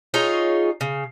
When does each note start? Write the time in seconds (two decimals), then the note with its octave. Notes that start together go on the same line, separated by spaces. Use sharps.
0.14 D#4 F4 G#4 C#5
0.81 C#3